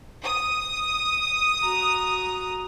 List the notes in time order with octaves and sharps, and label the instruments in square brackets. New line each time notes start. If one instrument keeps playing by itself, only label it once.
[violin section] D#6
[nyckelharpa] F#4 A#5